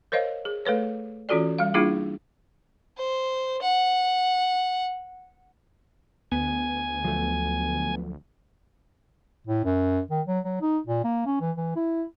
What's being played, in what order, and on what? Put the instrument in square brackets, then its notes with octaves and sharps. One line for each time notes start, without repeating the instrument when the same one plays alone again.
[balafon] A#4 C5 C#5 D#5 F5
G#4
A3 A4 B4 C#5
E3 C#4 F4 F#4 A4 D5
G3 F5
G3 A#3 D4 E4 F4 G#4
[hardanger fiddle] C5
F#5
[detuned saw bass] D2 [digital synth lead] B3 [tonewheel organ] G#5
[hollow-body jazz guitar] F3 F#3 A3
[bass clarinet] A2
F#2
D#3
F#3
F#3
D#4
A#2
A#3
C#4
E3
E3
E4